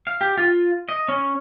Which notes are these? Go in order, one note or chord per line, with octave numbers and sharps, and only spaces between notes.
F5
G4
F4
D#5
C#4